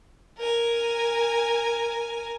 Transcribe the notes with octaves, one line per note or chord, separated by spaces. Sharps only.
A#4 G#5